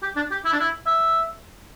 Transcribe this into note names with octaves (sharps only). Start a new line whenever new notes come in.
G4
D4
G4
E4
D4
E4
E5